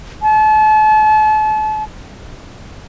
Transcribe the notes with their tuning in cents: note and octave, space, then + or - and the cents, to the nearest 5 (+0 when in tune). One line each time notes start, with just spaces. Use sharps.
A5 -40